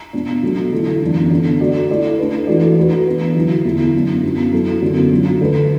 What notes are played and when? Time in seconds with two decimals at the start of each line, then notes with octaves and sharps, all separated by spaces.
0.13 B2 B3 D4
0.43 B2 F#3 A3 D4 F#4
0.72 D3 F#3 A3 E4
1.02 F#2 E3 B3 D4
1.30 D3 B3 D4
1.60 A3 F#4 A4 D5
1.90 A3 E4 D5
2.19 A3 D4 B4
2.47 E3 A3 F#4 A4 D5
2.77 A3 F#4 B4
3.06 E3 B3 D4 B4
3.35 D3 F#3 A3 E4
3.65 E2 D3 B3 E4
3.94 F#2 F#3 B3 D4
4.23 F#2 F#3 B3
4.53 F#3 B3 E4 A4
4.82 F#2 D3 F#3 B3 D4
5.11 F#3 B3 D4
5.41 D3 A3 D4 B4